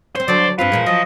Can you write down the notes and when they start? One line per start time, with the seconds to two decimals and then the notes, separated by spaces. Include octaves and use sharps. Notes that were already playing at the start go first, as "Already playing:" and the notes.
0.15 C4 C#4 C5
0.28 D3 F#3 D5
0.59 G2 C4 F4 B4 C5 F5
0.72 E2 A#2 G#3
0.86 F3 F#3 D#5